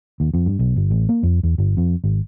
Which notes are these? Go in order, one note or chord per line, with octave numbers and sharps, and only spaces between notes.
D#2
F2
G2
B1
G1
A1
A#3
F2
E2
G1
F2
G#1